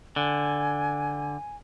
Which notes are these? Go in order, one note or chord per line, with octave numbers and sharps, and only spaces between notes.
D3 G#5